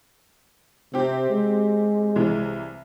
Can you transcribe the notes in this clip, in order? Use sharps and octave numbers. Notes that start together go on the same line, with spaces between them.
C3 C4 G4
G#3
C2 E3